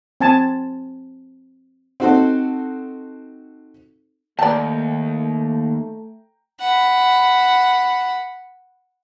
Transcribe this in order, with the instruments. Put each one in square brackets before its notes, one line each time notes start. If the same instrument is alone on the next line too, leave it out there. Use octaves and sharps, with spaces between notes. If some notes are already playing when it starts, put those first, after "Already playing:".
[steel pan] C4 G#5 A5
[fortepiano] C4 D#4 F#4 A4 C5
[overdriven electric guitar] D#2 [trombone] A3 [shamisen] D5 A5 [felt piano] G5 A#5
[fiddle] F#5 B5